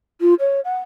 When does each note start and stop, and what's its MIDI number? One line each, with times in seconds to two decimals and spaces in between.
0.21 0.34 65
0.40 0.60 73
0.65 0.76 78